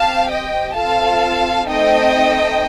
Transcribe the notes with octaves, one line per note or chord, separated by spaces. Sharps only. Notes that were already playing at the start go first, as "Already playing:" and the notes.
Already playing: C4 G4 F5 A5
D#5 G5
C4 F4 A4 F5 A5
A3 C4 D#4 A4 D#5 G5